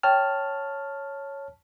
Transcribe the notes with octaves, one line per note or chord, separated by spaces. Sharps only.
C#5 G5 A5 F6